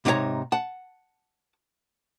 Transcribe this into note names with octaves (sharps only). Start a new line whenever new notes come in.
G#2 C3 D#4 F4 C#5 A#5
F#5 A5